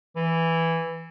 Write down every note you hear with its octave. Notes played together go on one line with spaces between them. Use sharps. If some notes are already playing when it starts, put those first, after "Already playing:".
E3